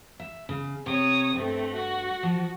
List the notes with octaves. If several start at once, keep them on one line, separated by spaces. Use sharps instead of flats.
E5
C#3
C3 C#5 D#6
G2 A3 C4
F#4
F3